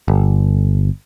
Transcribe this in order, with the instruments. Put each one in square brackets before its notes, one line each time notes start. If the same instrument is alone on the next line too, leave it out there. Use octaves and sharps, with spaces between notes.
[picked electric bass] G1